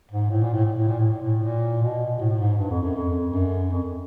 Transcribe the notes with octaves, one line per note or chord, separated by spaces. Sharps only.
G#2
A2
A#2
A2
A#2
A2
A#2
A2
A#2
A2
A#2
B2
A2
A2
G#2
G2
F2
F#2
F2
F#2
F2